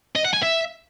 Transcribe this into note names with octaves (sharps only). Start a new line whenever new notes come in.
D#5
F#5
G#5
E5